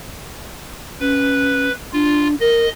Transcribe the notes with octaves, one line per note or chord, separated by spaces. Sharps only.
C#4 B4
D4 F4
A#4 D#5